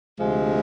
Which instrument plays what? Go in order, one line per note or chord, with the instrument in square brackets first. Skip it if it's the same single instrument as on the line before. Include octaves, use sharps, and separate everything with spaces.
[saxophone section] D2 C3 F3 G#3